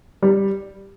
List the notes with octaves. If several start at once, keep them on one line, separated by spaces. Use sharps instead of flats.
G3